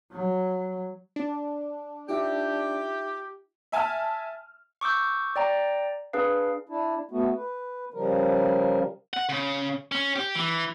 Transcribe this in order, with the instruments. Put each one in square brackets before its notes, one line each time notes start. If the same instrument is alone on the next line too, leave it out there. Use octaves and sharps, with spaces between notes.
[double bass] F#3
[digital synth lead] D4
[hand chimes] D#4 F4 E5 [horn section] G4
[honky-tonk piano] E5 G#5 A5 F6
[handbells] C#6 D6 E6 G6
D5 G5 A#5
D4 G#4 B4 F5
[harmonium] D4 E4
A3 B3 F#4
B4
C#3 F3 G3 A#4
[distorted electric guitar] F#5
C#3
C#4
G4
E3